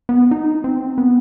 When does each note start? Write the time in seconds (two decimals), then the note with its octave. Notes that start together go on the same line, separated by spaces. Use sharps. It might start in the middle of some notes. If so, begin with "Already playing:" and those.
0.09 B3
0.31 D#4
0.64 C4
0.98 B3